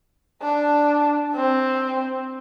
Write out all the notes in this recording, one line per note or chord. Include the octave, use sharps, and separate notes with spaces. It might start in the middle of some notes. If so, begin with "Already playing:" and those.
D4
C4